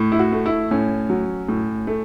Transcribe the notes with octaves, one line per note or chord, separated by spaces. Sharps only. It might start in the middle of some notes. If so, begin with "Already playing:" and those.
Already playing: A2
E4
F#4
A3
E4
A2 C#4
F#3
A2
A3